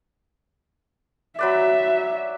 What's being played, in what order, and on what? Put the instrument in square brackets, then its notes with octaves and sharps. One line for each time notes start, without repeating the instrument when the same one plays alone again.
[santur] F#3 B4 D5 [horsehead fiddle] E5